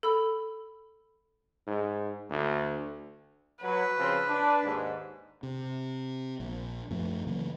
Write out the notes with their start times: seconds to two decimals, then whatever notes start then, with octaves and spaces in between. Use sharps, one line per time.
0.03 A4 B5 E6
1.67 G#2
2.30 D2
3.62 F#3 B4
3.97 C#3 F3 C4
4.27 D4
4.62 D#2 G#2
5.43 C3
6.40 A#1
6.90 F#2 F3 A3
7.27 C#3 E3 F#3 A#3